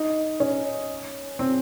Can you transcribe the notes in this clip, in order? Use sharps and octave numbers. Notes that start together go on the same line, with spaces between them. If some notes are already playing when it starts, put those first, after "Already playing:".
Already playing: D#4
C#4
C4